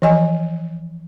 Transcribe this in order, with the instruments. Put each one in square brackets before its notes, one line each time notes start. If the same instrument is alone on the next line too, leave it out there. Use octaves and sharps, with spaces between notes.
[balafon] E3 F3 D#5 G#5